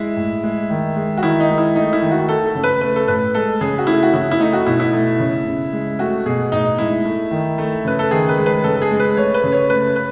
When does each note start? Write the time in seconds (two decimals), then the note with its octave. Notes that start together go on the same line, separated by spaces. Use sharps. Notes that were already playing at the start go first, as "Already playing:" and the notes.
Already playing: G#3 E4
0.16 A2
0.43 G#3
0.70 D#3
0.96 G#3
1.18 F#4
1.22 D#3 E4
1.40 D#4
1.49 G#3
1.58 E4
1.75 A3 D#4
1.93 E4
2.02 D#3
2.11 F#4
2.28 A3 A4
2.46 A4
2.55 C#3
2.64 B4
2.81 A3 B4
2.96 A4
3.08 A2 B4
3.35 G#3 A4
3.61 C#3 G#4
3.78 F#4
3.87 A3 E4
4.03 F#4
4.14 C#3 E4
4.31 E4
4.40 A3 D#4
4.53 F#4
4.67 B2 E4
4.80 E4
4.93 A3
5.20 C#3
5.46 C#3
5.73 G#3
5.99 A3 F#4
6.26 B2 G#4
6.52 A2 D#4
6.78 G#3 E4
7.05 A3
7.31 D#3
7.58 A3
7.85 C#3 B4
7.99 A4
8.11 D#3 G#4
8.29 B4
8.37 G#3
8.46 B4
8.64 C#3 A4
8.76 A4
8.82 G#4
8.91 G#3
9.00 B4
9.17 A3 C#5
9.34 B4
9.43 C#3
9.52 C#5
9.70 A3 B4
9.96 B4